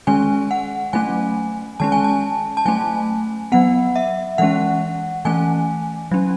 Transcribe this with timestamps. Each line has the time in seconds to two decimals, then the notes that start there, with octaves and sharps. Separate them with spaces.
0.07 D#3 G#3 C#4 G#5
0.51 F#5
0.93 F#3 A3 C#4 G#5
1.80 D#3 G#3 C#4 A5
1.92 G#5
2.04 A5
2.57 A5
2.66 F#3 A3 C#4 G#5
3.52 F#3 B3 F#5
3.96 E5
4.38 E3 G#3 C#4 F#5
5.25 E3 A3 C#4 G#5
6.11 F#3 C#4